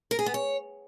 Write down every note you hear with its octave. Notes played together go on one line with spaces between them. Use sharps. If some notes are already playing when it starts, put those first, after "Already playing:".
A#4
G#4
B3
C#5